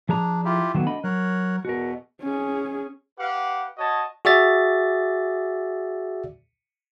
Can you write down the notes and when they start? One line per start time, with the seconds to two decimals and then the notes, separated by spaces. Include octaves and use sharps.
0.09 F3 D4 G#4 A#5
0.45 E4 F4 G4
0.75 D2 D3 D#3 F#3 B3
0.87 D4 D#5 B5
1.04 F#3 A#4 C#5 F#6
1.65 E2 B2 F#4 A#4
2.23 C#4 G#4
3.19 G4 B4 F5 F#5
3.78 F#4 C#5 D#5 A5
4.25 F#4 G#4 D5 E5 A6